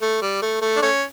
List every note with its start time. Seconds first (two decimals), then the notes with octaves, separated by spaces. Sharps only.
0.02 A3
0.21 G3
0.42 A3
0.61 A3
0.76 D4
0.82 A3 C#4